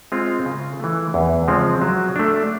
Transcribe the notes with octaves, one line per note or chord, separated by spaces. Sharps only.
G#3 C4 F4
C#3
E3 A3
E2
C#3 F3 G#3 C4
F#3
A3 D4